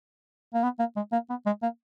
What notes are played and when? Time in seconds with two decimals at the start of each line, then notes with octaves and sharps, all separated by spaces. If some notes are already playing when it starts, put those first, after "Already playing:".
0.54 A#3
0.63 B3
0.79 A#3
0.96 G#3
1.13 A#3
1.30 B3
1.46 G#3
1.63 A#3